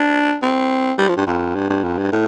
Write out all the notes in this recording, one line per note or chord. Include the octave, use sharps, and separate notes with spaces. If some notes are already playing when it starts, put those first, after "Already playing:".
Already playing: D4
C4
G3
F3
G2
F2
G2
G2
F2
G2
A2